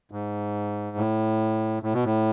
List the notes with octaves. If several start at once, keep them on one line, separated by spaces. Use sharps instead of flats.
G#2
A2
A2
B2
A2